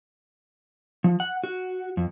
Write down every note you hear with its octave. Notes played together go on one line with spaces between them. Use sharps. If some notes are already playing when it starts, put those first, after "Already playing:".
F3
F#5
F#4
F2